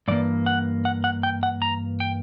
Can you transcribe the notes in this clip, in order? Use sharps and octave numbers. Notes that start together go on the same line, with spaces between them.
G2 E3 A#3 D5
F#5
F#5
F#5
G5
F#5
A#5
G5